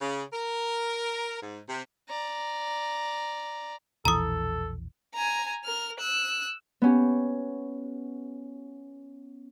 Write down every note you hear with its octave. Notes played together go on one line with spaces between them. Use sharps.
C#3
A#4
G#2
C3
D5 A#5
E1 A#1 E3 A4 A#5 D#6
G#5 A#5
A#4 F6
E6 F#6
B3 C#4 G4